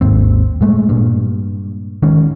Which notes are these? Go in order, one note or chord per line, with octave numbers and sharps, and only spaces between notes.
G#1 D#2 C4
A#2 G#3 A3
G2 A#2
D#3 G#3 C#4